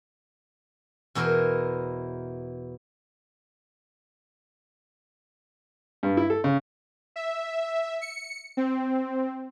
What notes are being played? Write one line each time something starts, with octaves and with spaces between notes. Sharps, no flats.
E2 B2 E4 A#4 C5
G2
E4
A4
C#3
E5
C#7
C4